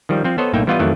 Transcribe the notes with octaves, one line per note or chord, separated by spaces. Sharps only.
D#3 F3 G3
F3 C4
B3 A4 C5 C#5 D#5
B1 A2 A#3 D#4 E5 G5
E3 G3 B3 F4 D#5
F2 D#3 E3 F#3 A3